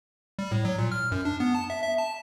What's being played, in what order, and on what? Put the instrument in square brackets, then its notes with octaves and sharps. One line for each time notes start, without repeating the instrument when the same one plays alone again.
[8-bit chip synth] G3
A2
F#3
A#2
F6
F#2
D4
B3
A5
E5
E5
A5